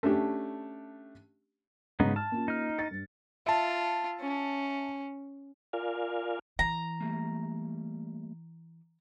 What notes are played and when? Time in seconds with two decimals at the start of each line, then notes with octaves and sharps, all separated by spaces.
0.03 A3 C#4 D4 G4
2.00 G#2 C#3 B3 D#4 A#5
2.16 A5 F6
2.32 A#3 C#4 F4
2.48 D#4 F6
2.78 A6 C#7
2.91 G2
3.46 F4 E5 A5
4.21 C#4
5.73 F4 A#4 D5 F5 G#5
6.59 E3 A#5
7.00 G3 A3 A#3